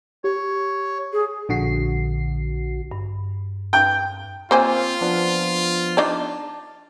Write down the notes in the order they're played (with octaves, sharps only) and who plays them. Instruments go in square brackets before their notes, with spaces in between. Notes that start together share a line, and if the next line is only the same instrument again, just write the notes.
[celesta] G4 [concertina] C#5
[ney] G#4
[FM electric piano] A#1 D3 F#4 C7
[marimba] G2
[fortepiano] G5
[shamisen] A#3 C5 G#5 [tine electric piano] C4 [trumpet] F4
[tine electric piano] F3 B3 D4
[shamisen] D4 D#4 D5 [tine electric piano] A5